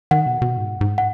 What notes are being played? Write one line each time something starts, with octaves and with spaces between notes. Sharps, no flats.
D#3 F#5
B2
B2
G#2
G#2
F#5